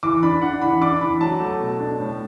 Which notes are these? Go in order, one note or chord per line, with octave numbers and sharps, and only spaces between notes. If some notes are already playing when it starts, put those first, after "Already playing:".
E3 D6
D4 B5
D4 F#5
E3 B5
D4 D6
E3 B5
F#3 A5
A3
B2
D4
A2